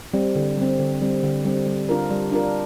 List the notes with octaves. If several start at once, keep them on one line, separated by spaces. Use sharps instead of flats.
G3 C4
D3
G3 C4
D3
G3 C4
D3
G3 C4
G3
D4 F4 A#4
G3
D4 F4 A#4